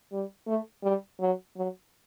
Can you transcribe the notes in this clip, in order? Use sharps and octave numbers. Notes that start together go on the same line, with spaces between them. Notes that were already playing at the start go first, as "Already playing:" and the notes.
G3
A3
G3
F#3
F#3